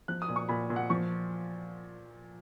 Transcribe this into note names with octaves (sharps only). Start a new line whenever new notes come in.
F3 F#6
D#6
A#2
C#6
A#2 B5
A#2
F#5
F3 C#6